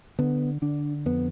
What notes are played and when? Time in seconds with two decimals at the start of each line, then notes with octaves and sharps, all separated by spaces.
0.19 D3 B3
0.62 D3 D4
1.06 F2 B3